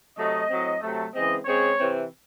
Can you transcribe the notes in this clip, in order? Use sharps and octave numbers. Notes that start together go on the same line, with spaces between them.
C3 F#3 A3 D#5
A2 F#3 C4
C3 F#3 A3
C#3 E3 G#3 C4 D#5
C#3 G#3 C4 C#5
C3 E3 C4